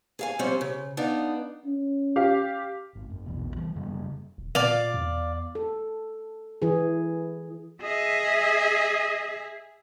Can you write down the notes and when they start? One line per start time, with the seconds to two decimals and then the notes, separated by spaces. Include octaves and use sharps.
0.19 G#4 F5 G#5
0.39 C3 F3 G3 C4 C#4
0.61 C#3
0.97 B3 D4 D#4 F5
1.66 C#4
2.16 G4 F5
2.95 G#1
3.10 F#1
3.26 A#1 E2 B2
3.57 E3 G3
3.75 F#2 C#3 G3 A#3
4.38 D#1
4.55 A#2 D5 F5
4.94 E2
5.55 A4
6.62 E3 G#4
7.83 G#4 D#5 E5